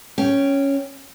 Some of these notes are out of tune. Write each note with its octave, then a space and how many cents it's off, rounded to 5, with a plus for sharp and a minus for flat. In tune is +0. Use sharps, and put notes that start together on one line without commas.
C#4 +0 G5 +0